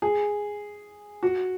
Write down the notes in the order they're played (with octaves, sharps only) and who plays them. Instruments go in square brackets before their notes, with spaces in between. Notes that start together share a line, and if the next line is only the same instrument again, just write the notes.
[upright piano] G#4
F#4